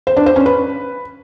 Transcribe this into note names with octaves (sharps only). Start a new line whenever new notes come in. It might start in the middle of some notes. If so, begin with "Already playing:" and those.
C5
D4
C5
C#4
B4